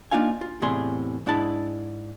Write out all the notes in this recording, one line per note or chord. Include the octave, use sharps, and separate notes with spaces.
A#3 D4 D#4 F4 F5 G#5
F4
E2 A2 C3 G#4 D5 C6
G#2 D4 E4 G#4 A5 B5